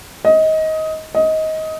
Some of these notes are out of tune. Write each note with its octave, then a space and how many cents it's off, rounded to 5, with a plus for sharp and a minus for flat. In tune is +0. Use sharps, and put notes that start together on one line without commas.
D#5 +20
D#5 +20